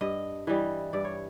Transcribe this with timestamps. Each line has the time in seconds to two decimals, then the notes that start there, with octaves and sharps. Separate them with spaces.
0.01 G2 D#5
0.47 E3 G3 D#5
0.93 G2 D5
1.05 C#5